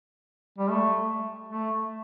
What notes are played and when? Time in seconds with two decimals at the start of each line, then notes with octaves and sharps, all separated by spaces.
0.58 G3
0.70 A3
1.48 A3